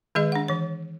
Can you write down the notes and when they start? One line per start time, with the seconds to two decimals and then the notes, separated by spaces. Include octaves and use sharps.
0.15 D#3 G#3 G#4 B4 D#5
0.32 D4 F#5
0.48 E3 C#5